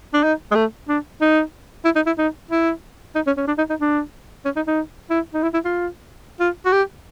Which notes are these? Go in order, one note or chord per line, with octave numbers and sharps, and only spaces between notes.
D4
D#4
G#3
A3
D4
D#4
E4
D#4
E4
D#4
E4
D#4
C#4
C#4
D4
D#4
D#4
D4
C#4
D#4
D#4
E4
D#4
E4
E4
F4
F4
F#4
G4